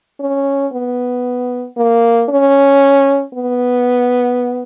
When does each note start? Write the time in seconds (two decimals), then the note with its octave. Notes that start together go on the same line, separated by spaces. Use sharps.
0.20 C#4
0.72 B3
1.77 A#3
2.29 C#4
3.34 B3